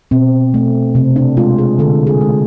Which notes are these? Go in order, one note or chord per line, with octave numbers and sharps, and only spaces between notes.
B2 C4
A3
C3 C4
D4
G#3 F4
G#4
D3 A4
G#4
G#3